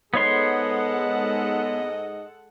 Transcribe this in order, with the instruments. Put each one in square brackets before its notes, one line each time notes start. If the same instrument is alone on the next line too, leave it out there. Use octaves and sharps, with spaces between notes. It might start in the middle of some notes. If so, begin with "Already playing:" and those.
[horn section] G#2 D#5 [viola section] G#3 A4 F#5 [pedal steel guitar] B3 C#5 C6